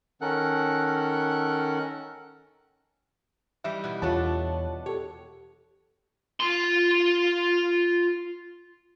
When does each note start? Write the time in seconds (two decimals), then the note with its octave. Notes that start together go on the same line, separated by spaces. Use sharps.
0.21 D#3 C#4 A4 A#4 F#5 F#6
3.64 E3 G3 D#4 E5
3.84 B2 E4
4.02 E2 B3 D4 F4 A4 C#5 A5
4.86 G4 A4 C#5
6.40 F4 C6